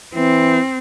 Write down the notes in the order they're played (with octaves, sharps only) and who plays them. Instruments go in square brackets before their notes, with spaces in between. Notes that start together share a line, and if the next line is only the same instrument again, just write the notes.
[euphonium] E3 [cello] C4